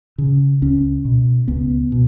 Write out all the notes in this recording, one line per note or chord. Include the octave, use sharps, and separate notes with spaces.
C#3
C#2 C#4
B2
C#2 B3
B2